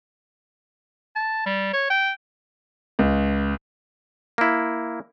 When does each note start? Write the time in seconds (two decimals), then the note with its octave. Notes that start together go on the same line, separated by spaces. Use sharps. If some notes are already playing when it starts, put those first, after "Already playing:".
1.16 A5
1.46 G3
1.73 C#5
1.90 G5
2.99 C#2
4.38 A#3 E4